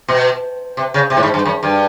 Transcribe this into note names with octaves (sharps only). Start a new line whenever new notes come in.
B2
C3
C#3
C3
A2
G#2
G2
F#2
G2